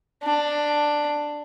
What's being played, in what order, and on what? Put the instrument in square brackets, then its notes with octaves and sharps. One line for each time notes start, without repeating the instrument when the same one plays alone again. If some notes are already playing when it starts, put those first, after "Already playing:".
[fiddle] D4